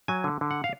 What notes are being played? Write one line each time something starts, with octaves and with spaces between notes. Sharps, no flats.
F#3 G#5
D3
D3
F#5
F5